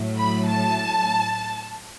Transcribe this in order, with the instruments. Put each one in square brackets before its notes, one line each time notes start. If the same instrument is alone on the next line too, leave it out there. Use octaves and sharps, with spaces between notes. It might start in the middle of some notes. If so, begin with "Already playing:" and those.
Already playing: [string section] A2 F#3 A3
B5
A5